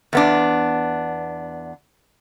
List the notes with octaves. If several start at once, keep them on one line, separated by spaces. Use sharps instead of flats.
E2 B3 D4